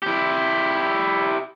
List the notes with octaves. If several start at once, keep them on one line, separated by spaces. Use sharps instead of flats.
E4 G4